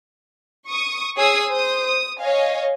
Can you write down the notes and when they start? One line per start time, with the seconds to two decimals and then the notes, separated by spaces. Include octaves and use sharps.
0.69 C#6 D#6
1.17 G#4 C#5 G#5 D#6 E6 C7
1.50 C5 D#6
1.85 D#6
2.19 C#5 D#5 F5 G#5